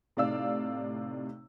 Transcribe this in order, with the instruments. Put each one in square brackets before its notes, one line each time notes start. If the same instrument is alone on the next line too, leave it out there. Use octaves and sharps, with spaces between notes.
[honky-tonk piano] A2 C3 D#4 D5 F5 E6